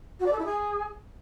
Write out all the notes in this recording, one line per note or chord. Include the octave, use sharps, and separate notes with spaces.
F#4
D5
A4
E4
G#4